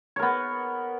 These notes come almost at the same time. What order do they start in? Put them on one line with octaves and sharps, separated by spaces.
C#5 A#4 B3